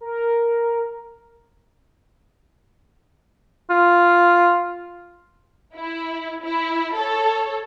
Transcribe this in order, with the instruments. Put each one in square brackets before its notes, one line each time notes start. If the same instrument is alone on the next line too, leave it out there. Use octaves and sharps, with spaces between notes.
[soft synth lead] A#4
[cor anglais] F4
[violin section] E4
E4
A4 C#5